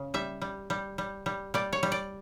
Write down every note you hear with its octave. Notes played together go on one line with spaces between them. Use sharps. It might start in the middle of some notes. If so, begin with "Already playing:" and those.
Already playing: C#3
G3 E5
G3
G3
G3
G3
G3 D5
C#5
G3
D5